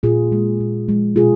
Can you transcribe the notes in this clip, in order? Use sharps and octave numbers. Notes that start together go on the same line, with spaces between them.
A#2 F4 G#4
G#3
A#2
F3 G#3
B2 F4 G#4